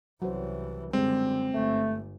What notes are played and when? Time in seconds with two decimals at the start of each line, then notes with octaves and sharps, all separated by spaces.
0.22 C2 E3 F#3 F#4 C5
0.93 F#2 D3 G3 G#3 C4
1.54 G1 A3